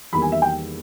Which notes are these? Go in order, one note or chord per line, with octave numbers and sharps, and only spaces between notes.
E2 D#3 G3 A#3 B5
G#5
E5
G5